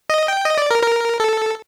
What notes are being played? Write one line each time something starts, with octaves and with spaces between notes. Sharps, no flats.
D#5
G5
D#5
D5
A#4
A#4
A4